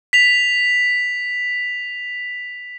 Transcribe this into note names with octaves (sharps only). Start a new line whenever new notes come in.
B6 F7